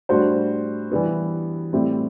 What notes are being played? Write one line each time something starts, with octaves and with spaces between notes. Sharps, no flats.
A2 G3 D4 F#4 C5
E3 G3 B3
A2 G3 C4 E4 G4